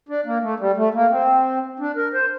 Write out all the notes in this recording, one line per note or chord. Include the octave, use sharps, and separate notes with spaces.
D4
A#3
A3
G3
A3
A#3
C4
D4
A#4
C5